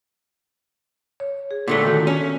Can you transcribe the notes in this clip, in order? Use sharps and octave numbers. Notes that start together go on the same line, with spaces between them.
C#5
G#4
A#2 D3 A3
D#3 F#4 A4
C#4